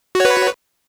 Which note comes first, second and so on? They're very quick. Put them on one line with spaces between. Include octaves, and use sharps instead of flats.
F#4 C#5 B4